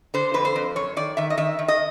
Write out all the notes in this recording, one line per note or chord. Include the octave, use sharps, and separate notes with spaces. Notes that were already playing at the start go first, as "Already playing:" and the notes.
D3 C5
F2 B4
C5
F2
F#2 C#5
D#3 D5
D#3 E5
D#5
D#3 E5
D#3
D#5